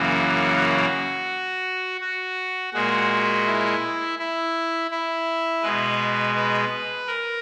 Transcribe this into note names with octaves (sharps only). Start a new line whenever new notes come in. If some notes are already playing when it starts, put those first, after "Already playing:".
Already playing: F#2 C#3 E3 A#3 F#4
F#4
F#4
A#2 G#3 F#4
E4
E4
E4
B2 G#3 B4
B4
A#4